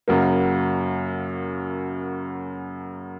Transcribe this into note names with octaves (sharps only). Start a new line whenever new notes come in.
F#2 C#3 F#3 A#3